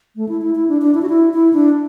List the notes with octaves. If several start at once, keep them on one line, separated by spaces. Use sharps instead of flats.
A3
E4
E4
E4
D4
D4
E4
F#4
E4
E4
D4